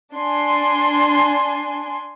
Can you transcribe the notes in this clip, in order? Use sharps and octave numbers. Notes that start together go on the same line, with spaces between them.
D4 G#5 C6